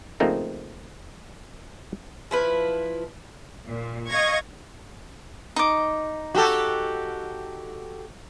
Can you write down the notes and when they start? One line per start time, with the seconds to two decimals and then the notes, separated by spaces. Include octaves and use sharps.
0.20 C#3 F3 A3 A#3 C4 D#4
2.31 F3 E4 B4
3.66 A#2
4.08 D#5 F5 C#6 G#6 A#6
5.56 D#4 D6
6.35 F#4 G4 A4